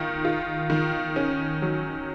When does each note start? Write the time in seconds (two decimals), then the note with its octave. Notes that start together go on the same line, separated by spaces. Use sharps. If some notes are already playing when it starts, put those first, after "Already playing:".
Already playing: D#3 F4
0.25 F4
0.70 D#3
1.16 C#4
1.62 F#3